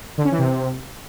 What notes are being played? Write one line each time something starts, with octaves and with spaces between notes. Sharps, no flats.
D3
C#4
E3
C3